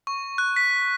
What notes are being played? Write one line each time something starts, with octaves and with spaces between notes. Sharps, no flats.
C#6
F#6
B6